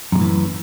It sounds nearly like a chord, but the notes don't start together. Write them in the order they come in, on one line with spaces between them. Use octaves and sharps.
F#2 C3 A2 E3